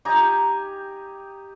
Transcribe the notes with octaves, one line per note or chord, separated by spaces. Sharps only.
D#4 G4 G#5 A#5